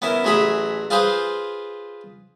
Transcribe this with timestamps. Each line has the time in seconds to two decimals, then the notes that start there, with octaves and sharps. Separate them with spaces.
0.02 B3 C#4 E4 A#4
0.24 A1 F#3 A3 G#4 E5 B5
0.90 F4 G#4 B4 C5 F5 G#5